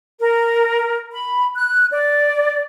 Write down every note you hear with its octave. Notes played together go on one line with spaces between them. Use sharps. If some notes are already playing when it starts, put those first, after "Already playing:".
A#4
B5
F#6
D5